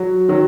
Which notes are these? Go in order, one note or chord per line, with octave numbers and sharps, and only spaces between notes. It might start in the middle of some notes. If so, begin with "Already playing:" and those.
Already playing: F#3
D#3 F#3